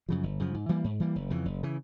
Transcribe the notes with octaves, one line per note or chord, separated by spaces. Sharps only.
F#2 C#3 F3
G1
F#2 C#3 F3
G#2
E3 G3 A#3
G#2
E3 G3 A#3
F#1
F2 C#3 E3
F#1
C#3 E3